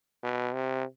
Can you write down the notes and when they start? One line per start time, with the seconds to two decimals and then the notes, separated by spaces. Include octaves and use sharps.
0.24 B2
0.53 C3